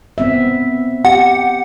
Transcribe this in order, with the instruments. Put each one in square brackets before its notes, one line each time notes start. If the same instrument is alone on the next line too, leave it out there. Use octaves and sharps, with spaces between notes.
[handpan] B3 C4 E5
[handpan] G4 [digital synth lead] F#5